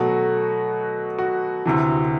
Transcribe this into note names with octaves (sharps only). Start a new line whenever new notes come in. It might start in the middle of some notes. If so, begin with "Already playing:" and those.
Already playing: B2 F#3 A3 F#4
F#4
D2 C3 E3